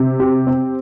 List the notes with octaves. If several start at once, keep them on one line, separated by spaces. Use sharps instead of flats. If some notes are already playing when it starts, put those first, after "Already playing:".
Already playing: C3
G4
C4